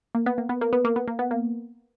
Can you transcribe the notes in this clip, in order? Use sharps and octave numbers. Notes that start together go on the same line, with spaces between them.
A#3
B3
A#3
B3
A#3
B3
A#3
B3
A#3
B3
A#3